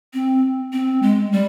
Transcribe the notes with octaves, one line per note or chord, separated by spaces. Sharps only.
C4
C4
G#3
G3